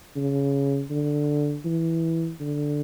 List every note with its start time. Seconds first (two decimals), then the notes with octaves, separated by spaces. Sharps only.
0.16 C#3
0.90 D3
1.65 E3
2.40 D3